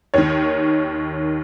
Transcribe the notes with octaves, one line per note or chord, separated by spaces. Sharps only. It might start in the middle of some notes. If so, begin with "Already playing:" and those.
D#2 D#3 C#5